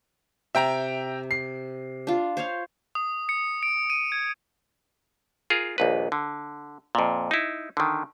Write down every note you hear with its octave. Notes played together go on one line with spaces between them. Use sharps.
C3 E5 G5 A#5
C7
D4 F4
C5 C#5 F5
D#6
C#7
D7
D#7
G#6
F4 G#4 A#4
A#1 D#2 B4
D3
F2 A#2
D#4 E4
D3 D#3